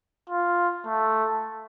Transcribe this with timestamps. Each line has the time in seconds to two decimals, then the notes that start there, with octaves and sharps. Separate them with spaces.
0.30 F4
0.86 A3